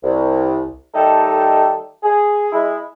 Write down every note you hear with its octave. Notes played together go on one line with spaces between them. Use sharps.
C2
D#3 G3 A3 D#4 G4 A4
G#4
G#3 E4